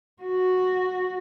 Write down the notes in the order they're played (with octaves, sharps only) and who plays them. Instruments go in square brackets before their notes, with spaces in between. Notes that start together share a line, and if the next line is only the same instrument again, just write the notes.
[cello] F#4